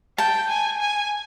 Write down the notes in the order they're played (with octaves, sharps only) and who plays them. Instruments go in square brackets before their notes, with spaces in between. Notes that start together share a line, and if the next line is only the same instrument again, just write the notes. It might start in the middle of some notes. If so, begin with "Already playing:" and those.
[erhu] G5 [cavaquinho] A5
[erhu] G#5
G#5